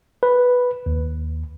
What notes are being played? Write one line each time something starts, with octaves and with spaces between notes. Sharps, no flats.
B4
D#2